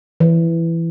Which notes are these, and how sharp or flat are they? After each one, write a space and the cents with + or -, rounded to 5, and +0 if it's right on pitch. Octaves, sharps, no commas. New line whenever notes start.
E3 +10